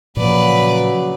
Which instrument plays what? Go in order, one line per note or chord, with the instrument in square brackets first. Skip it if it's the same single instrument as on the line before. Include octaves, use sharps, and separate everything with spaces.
[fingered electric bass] A#2 F3 A#3 [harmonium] C#3 F#3 [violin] B4 D5